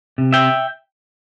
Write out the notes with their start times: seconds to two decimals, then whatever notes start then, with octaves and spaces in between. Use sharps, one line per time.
0.18 C3
0.33 E5 G5